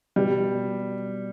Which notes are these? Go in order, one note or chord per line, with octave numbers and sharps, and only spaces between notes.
B2 G3